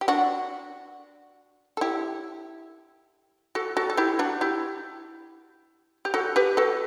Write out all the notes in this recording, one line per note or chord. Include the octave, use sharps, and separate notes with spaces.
G4
D4 F#4
A4
E4 G4
F#4 A4
F#4 A4
A4
E4 G4
D4 F#4
E4 G4
G4
F#4 A4
G4 B4
F#4 A4